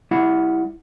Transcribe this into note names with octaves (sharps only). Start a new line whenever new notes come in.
G3 E4 F#5